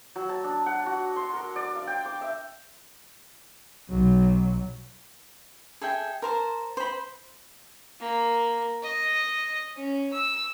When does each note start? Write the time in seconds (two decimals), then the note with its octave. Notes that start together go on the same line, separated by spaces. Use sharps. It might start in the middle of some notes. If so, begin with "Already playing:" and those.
0.16 F#3
0.29 A5
0.44 D4
0.66 F#5
0.86 F#4
1.16 C6
1.34 A#4
1.56 D5
1.75 F5
1.87 G5
2.06 D6
2.21 E5
3.90 B1 F#3
5.81 G#4 A4 E5 G5
6.22 A#4 C5 A5
6.77 C5 B5
8.00 A#3
8.83 D#5
9.76 C#4
10.13 E6